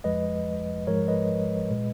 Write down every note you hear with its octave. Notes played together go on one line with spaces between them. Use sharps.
F2 F3 G#3 B4 D#5
G#2 F3 G#3 A#4 C#5
B4 D#5
A#2 G#3